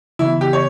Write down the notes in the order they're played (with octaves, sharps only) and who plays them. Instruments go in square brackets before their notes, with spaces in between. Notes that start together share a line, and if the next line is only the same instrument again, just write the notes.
[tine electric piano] C#3 E3 B3 [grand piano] E4
[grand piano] G4
C#5